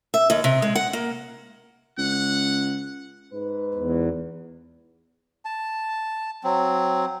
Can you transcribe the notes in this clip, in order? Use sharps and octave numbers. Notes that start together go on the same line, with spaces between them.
E5
D#2
C3
G#3
F#5
A#3
C#2 F#5
G#2 B4
E2
A5
F#3 C4